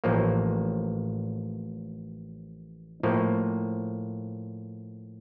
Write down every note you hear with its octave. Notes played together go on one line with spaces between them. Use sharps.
A1 A2 F3 A#3
A2 F3 A#3